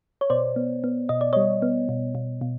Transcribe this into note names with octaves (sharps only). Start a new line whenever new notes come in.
C#5
B2 C5 D5
B3
B3
B2 D#5
D5
G3 C#5 D#5
B3
B2
B2
B2